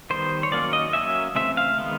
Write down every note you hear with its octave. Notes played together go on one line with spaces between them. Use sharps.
D#3 G3 B3 C5
C#5
D#3 F#3 A#3 C#4 D5
D#5
F#3 A#3 C#4 E5
C#3 E3 A3 C4 E5
F5
D#3 G#3 B3